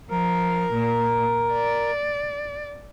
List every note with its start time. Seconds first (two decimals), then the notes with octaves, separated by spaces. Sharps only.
0.10 F3 A#4
0.73 A#2
1.53 D5